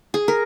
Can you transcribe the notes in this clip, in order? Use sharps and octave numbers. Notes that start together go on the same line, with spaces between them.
G#4
A#4